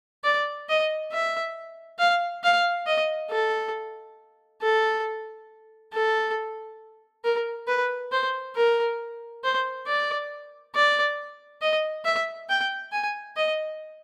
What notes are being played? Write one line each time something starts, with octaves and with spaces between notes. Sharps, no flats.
D5
D#5
E5
F5
F5
D#5
A4
A4
A4
A#4
B4
C5
A#4
C5
D5
D5
D#5
E5
G5
G#5
D#5